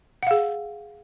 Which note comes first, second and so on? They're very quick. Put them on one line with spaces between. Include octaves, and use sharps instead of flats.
F#5 F5 G#4